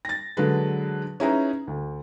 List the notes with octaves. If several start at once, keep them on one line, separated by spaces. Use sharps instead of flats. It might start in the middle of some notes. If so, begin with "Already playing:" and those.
A6 A#6
D3 F#3 G#3 A4 B4
C#4 D#4 E4 G#4 B4 A#5
D2